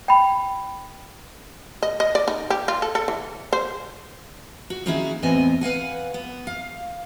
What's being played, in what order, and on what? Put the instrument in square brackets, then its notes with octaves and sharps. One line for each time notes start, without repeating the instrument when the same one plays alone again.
[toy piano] G5 B5
[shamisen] D#5
D#5
D5
D#4
G4
F4
A4
A4
E3
C5
[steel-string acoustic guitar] F#4
D#3 A#3 C#4 E4 F#4 G#4
E2 A2 B3 C4 D#5 G#5
B4 F5 F#5 G#5
B3
F5